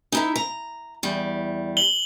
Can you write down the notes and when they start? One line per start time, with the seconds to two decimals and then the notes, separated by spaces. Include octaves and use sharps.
0.12 D#4 E4 E5
0.36 A#5
1.03 E2 G3
1.77 F#7 G7